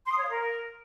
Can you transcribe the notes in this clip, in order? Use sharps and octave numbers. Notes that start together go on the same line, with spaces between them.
C6
D#6
C#5
F5
A#4